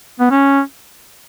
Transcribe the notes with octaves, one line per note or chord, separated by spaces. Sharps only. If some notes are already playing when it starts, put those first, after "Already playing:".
B3
C#4